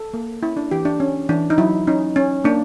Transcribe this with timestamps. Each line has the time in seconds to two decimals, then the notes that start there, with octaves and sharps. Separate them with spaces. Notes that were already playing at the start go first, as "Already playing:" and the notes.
Already playing: A4
0.14 A#3
0.43 C#4 E4
0.57 D4
0.71 E3 G4
0.85 D4
1.00 C#4
1.29 E3 D4
1.50 D#4
1.58 F#3 E4
1.87 C#4 D#4
2.16 C#4
2.44 A#3 D4